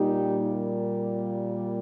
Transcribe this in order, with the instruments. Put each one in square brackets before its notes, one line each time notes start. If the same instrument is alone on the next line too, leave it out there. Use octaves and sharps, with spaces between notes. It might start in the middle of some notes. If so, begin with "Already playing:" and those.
Already playing: [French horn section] A#2 G3 A#3 D#4 G4